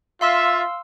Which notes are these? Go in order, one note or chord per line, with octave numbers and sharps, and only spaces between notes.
F4 E5 F5 C6 E6